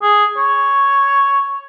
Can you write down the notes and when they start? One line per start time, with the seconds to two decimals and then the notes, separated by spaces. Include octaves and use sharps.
0.02 G#4
0.37 C#5